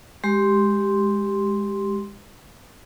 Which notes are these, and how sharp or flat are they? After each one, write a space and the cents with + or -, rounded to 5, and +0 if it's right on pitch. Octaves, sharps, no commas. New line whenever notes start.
G#3 -10 G4 +0 C6 +0